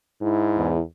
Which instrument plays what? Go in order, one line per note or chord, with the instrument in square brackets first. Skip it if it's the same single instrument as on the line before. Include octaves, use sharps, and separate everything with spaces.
[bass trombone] G#2 [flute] E4
[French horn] E2